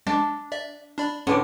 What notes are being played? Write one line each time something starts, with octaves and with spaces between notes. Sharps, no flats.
G#3 D4
D5 E5
D4 D5 B5
A2 D3 C#4 B4 D6